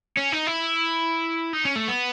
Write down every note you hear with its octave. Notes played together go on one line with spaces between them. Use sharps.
C#4
D#4
E4
D#4
C#4
A3
B3